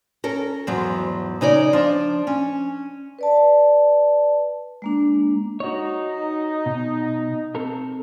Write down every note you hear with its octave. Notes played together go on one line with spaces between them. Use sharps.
C#4 A4 A#4
E2 G#2 F3 F#3
C#3 D#4 C#5 D5
F3 D4
C#4
B4 D5 A5
G#3 A#3 D4
D#4 F#4 C#5
B2
C4 A4 A#4